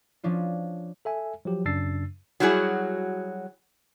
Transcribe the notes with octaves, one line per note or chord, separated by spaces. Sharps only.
F3 C#4 D4 F4
A4 E5 G#5
F3 F#3 G4
F#2 C#3 D4 E6 A6 C7
F#3 G3 E4 F#4 G#4